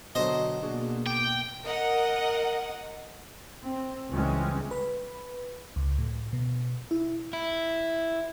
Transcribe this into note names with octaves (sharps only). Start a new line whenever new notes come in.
B2 D3 F#3 C5 D#5
B2 A#3 D4 F#4 G#4
G5 D6
A#4 D#5 F#5
C4
C#2 E3 G3 G#3 C4 C#4
B4
C#2
A2
B2
E4
E4